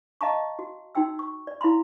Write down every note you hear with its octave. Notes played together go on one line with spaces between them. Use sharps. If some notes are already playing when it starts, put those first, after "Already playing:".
D#5 F5 A5 A#5 C#6
F#4
D#4 F#4 G5 E6
C#6
D5
E4 F5 B5 C6